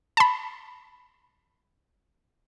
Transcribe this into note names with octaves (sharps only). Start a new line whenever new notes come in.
A5 B5